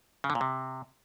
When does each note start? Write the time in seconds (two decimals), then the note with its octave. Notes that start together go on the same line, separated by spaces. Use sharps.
0.24 C#3
0.30 D3
0.35 A#2
0.41 C3